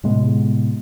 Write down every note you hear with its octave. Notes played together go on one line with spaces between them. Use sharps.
A2 C3 G#3 B3